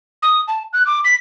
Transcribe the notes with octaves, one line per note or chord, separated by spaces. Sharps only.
D#6
A5
F#6
D6
B6